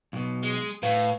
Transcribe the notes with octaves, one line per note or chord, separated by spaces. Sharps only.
B1 B2
G#3
A2 B4 F5